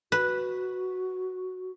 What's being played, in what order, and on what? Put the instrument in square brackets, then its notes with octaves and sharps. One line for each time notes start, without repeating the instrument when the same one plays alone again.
[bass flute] F#4 [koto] B4